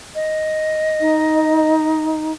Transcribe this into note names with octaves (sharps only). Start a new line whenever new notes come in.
D#5
D#4